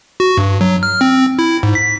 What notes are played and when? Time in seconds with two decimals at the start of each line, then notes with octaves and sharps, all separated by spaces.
0.20 F#4
0.37 G2
0.61 F#3
0.83 F6
1.01 C4
1.39 E4
1.63 G#2
1.75 B6